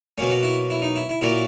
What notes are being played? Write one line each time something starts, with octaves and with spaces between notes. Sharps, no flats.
B2 F#3 A#3 C#4
F#4
E4
E4
D#4
E4
E4
A#2 F#3 A#3 E4